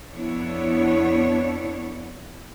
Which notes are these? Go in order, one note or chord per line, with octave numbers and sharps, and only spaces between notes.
F2 B3 D4 E4 C#5